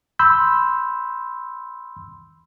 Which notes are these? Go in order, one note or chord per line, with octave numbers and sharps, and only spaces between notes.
B5 C6 E6 G6